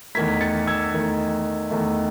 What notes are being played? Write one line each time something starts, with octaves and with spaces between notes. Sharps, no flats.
E2 D#3 A3 G#6 B6
A6 C#7
E6 G#6
E2 D#3 A3
E2 D#3 A3